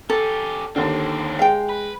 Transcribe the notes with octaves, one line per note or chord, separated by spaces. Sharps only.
C#4 G4 A4
D#2 D3 C4 D4
G#3 F5 G5
B4